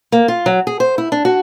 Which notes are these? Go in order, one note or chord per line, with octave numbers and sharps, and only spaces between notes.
A#3
F4
F#3
G#4
C5
E4
D4
F#4